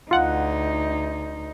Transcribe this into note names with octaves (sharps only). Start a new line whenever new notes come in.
D2 D#4 F4 F#5